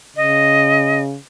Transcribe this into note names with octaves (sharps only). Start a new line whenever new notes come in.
C#3 D#5